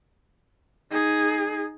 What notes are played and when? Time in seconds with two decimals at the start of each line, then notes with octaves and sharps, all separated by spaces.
0.91 D#4 G#4